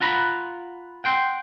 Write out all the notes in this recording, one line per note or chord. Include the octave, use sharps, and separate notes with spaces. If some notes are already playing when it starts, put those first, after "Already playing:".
F4 F#5 A#5 B5
F#5 G5 C6